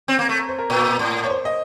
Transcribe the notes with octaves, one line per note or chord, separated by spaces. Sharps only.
C4
A#3
A3
A#5
C5
A#4
A#2
A2
C#5
C5
D#5